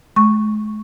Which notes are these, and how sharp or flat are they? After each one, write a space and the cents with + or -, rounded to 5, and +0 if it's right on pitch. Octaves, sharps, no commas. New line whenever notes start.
G#3 +45 C#6 -5